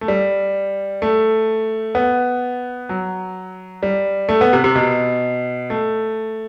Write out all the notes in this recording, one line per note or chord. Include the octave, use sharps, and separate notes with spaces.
A3
G3
A3
B3
F#3
G3
A3
B3
C3
C3
B2
A3